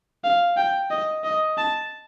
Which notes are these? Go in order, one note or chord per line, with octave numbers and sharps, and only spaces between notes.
F5
G5
D#5
D#5
A5